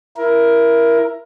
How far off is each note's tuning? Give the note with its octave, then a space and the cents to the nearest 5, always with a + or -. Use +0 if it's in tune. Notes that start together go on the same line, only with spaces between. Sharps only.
E4 +15 A#4 +15